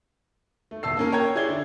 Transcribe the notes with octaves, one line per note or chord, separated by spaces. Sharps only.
A3
E1 A5 E6 C7
A#3 C#4 A#4
C#5 G5 A#5 G#6
E4 G#4 D5 G#6 G7
D3